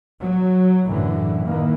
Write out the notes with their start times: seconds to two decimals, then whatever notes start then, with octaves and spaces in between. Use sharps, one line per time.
0.20 F#3
0.86 F#2 A2 D3 E3
1.45 D#3 E3 A#3